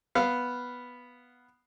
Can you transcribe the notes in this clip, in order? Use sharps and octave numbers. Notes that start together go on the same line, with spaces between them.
B3 F5